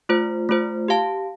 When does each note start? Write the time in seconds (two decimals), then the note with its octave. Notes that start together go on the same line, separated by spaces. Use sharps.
0.09 A3 F4 C5
0.49 A3 F4 C5
0.88 G4 F5 A5